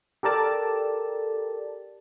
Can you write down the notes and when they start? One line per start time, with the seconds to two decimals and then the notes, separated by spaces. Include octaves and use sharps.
0.23 G4 A4 A#4 D5 A5